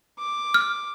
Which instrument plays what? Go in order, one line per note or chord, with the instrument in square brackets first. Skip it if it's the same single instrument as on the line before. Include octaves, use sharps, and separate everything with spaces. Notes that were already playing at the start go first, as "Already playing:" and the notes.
[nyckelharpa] D6
[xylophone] F6